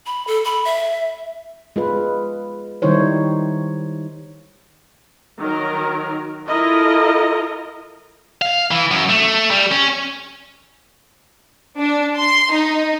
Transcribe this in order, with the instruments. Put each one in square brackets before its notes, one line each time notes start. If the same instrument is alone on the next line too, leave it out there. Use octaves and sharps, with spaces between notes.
[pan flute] B5
A4
B5
E5
[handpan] G#3 F4 B4
D#3 G3 D#4 E4 C5 C#5
[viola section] D#3 F#3 A#4
E4 F4 A4 A#4 D#5
[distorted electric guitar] F5
E3
F#2
A3
G3
C#4
[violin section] D4
C6
D#4